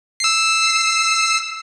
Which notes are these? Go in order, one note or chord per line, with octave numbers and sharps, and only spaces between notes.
E6 C7